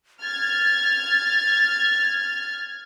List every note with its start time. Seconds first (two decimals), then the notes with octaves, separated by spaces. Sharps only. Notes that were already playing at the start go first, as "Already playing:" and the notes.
0.23 F6 G#6 A6